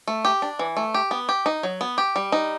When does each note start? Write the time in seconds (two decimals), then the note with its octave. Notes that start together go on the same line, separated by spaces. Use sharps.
0.08 A3
0.25 G4
0.42 D4
0.59 E3
0.77 A3
0.94 G4
1.11 B3
1.29 G4
1.46 D#4
1.63 F#3
1.81 B3
1.98 G4
2.16 G3
2.32 D#4